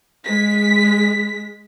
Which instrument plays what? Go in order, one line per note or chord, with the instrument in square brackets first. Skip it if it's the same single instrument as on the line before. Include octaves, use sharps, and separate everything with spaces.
[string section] G#3 B6